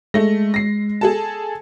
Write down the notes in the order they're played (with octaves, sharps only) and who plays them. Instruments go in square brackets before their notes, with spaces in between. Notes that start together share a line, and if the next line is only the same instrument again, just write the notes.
[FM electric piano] G#3 [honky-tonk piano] A3 A#6
[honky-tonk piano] A#6 C7
G#4 A4 A5